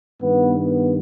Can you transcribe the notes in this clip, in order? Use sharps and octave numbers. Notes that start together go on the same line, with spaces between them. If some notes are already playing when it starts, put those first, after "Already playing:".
G2 D#3 B3
B3